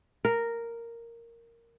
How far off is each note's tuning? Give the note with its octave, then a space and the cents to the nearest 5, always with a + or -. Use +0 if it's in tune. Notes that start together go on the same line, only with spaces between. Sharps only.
A#4 -5